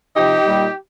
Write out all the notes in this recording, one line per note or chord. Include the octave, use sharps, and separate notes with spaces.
C3 F3 D#4 G4
A#2 G3